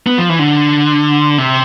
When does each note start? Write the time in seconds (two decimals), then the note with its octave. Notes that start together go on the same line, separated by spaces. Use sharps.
0.06 B3
0.18 F3
0.29 E3
0.39 D3
1.38 C3